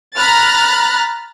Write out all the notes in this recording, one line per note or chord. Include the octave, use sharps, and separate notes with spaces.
A#5 B5 F6 F#6 A6